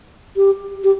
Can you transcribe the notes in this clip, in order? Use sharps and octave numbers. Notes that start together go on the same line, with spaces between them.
G4
G4